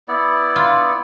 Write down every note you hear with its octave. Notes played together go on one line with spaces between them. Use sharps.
B3 E4 D5
F4